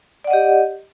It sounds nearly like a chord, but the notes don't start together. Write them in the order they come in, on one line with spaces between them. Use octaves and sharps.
D5 F#5 D#5 G4